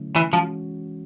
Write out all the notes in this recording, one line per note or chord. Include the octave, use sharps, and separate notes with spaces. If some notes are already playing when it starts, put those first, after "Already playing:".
Already playing: D3 F#3 A3 C#4 E4
E3
E3 F3 G#3 C#4 F#4